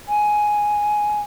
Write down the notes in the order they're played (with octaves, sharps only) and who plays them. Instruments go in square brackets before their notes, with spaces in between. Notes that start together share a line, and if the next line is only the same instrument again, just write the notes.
[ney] G#5